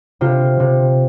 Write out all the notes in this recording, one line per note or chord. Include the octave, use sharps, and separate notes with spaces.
C3 F4
C3